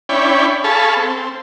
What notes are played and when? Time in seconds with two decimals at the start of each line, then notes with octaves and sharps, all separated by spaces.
0.09 C#4 D4 E4 C#5 G5 B5
0.64 G#4 A4 F5 A5 B5 C#6
0.96 C4